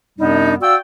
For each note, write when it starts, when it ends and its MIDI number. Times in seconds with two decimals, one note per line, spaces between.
0.19 0.55 42
0.19 0.55 48
0.19 0.55 55
0.19 0.55 59
0.19 0.55 62
0.19 0.55 63
0.61 0.75 66
0.61 0.75 74
0.61 0.75 77
0.61 0.75 79
0.61 0.75 88